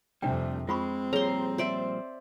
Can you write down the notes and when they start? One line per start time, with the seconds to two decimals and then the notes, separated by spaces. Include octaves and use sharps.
0.22 F2 C3 G3 A3 C4 D4 G5
0.69 G#3 C4 F4 B5 C#6
1.13 A#2 F3 G3 G#4 C#5 A#5 C6
1.58 C5 D5 E5